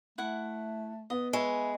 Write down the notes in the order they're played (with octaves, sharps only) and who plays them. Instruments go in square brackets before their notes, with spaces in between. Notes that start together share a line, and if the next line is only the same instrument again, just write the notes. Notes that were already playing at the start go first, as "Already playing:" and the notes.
[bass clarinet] A3 [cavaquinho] E4 F#5
[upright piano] B3 [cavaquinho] D#5
[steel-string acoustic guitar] G#3 [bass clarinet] B4 [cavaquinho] C#5 E5 G#5